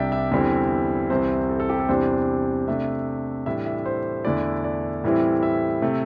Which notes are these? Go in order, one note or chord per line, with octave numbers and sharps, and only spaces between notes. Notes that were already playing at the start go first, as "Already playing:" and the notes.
Already playing: C2 C3 G3 D4 D5 E5 G5
E5
E2 D3 G3 C4 E4 E5
C2 C3 E3 C5
A4
A4
G4
A4
E2 C3 E3 G3 D4 C5
C3 A3 D4 E5
A2 E3 G3 D4 E5
E5
C5
E2 D3 A3 E4 D5
D5
A2 E3 G3 C4 E4
E5
C3 A3